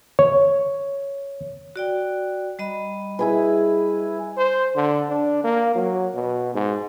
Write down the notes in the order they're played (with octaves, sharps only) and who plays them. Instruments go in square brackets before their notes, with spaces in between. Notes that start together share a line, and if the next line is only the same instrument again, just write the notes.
[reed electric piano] C#5
[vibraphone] F#4 D5 G5
G3 D#5 B5
[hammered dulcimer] E4 G#4 B4
[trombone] C5
D3
D4
A#3
F#3
B2
G#2